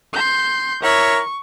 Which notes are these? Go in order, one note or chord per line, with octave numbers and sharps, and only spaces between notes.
C6 G6
E4 A#4 C#5 C#6